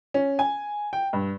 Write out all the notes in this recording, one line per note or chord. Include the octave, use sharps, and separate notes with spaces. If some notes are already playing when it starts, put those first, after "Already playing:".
C#4
G#5
G5
G2